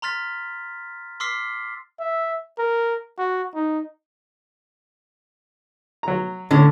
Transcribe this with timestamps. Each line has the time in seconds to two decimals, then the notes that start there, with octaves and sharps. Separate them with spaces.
0.02 A#5 C6 F6 A6 B6
1.20 C6 D6 E6 F6 B6 C7
2.00 E5
2.58 A#4
3.18 F#4
3.54 D#4
6.03 F#3 A#5
6.51 A2 D3 C#4